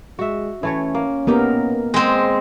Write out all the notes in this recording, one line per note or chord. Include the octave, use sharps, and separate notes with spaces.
G#3 F#4 E5
E3 A3 C#4 C#5
A#3
A#3 B3 D#4 G4 A#4
G#3 C4